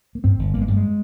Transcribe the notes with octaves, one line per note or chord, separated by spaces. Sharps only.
A#3
G2 C4
G1
G1 A#3
G#3
G2 G3
G#3